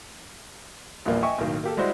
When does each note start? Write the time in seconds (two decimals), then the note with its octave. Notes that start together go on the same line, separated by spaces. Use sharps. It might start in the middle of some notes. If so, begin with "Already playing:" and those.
1.05 A#1 E2 F3 G3 A#3
1.22 D#5 E5 G5 G#5 C#6
1.38 B1 A2 D#3 A#3
1.64 A#3 G4 A4
1.77 G3 G#3 E4 F#4 C5